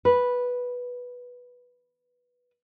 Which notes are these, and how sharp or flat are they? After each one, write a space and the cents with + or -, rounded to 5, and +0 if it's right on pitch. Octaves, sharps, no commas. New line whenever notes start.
B4 -5